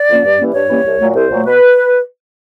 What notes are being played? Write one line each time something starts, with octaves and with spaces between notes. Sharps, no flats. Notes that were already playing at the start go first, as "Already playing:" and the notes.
Already playing: D5
D3 F3 A#3 C#4
G2
E3 G3 A#3 C#4
G2 C#5
E3 G3 A#3 C#4
C2
A#2 F#3 A3
C2 C5
A#2 F#3 A3
B2 B4